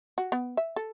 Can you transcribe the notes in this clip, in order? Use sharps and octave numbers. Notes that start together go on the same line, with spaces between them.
F#4
B3
E5
A4